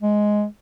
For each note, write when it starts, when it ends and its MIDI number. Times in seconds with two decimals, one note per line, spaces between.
0.02 0.44 56